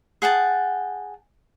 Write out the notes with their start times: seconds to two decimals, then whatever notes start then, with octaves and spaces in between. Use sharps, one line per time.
0.22 G#4 F#5 G5 A5